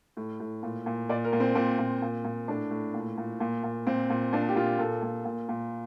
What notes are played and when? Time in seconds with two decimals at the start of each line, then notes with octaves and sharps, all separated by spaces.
0.17 A2
0.40 A2
0.63 A#2
0.86 A#2
1.09 A#2 D5
1.24 A#4
1.33 A#2
1.40 C4
1.55 A#2 C4
1.79 A#2
2.02 A#2
2.25 A#2
2.48 A2 D4
2.71 A2
2.94 A#2
3.18 A#2
3.40 A#2
3.64 A#2
3.87 A#2 C4
4.10 A#2
4.33 A#2 D4
4.49 G4
4.56 A#2 F4
4.79 A#2 A4
5.02 A#2
5.25 A#2
5.49 A#2